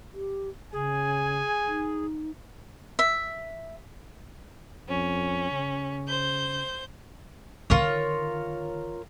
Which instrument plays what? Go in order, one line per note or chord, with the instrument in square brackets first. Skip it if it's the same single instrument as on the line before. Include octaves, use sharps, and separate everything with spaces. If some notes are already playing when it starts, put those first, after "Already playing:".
[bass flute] G4
[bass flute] C#3 [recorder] G#4 [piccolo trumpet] G#5
[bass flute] D#4
[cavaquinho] E5
[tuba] F2 [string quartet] C#4
[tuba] C#3
[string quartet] C5 G6
[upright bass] D3 D#3 [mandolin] F4 A#4 C#5